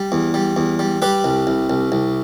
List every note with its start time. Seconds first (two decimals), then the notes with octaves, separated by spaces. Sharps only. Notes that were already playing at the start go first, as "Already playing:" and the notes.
Already playing: G3
0.12 E2
0.34 G3
0.56 E2
0.79 G3
1.02 G3 G4 B4
1.24 C2
1.47 C2
1.70 C2
1.92 C2